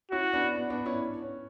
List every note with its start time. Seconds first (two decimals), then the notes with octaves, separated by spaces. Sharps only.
0.11 C#4 E4 F#4
0.33 B3 D4
0.56 B3
0.70 B3 D4
0.86 C#4 E4
1.01 C#4
1.22 C#4